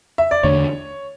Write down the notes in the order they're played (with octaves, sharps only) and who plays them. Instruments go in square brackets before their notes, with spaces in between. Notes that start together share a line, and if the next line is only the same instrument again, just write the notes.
[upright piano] E5
D5
[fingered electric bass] E2 D3 A3 D4 [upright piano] C#5